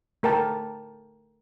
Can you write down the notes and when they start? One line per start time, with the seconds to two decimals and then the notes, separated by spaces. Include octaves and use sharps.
0.23 A3 A#4 G5 A5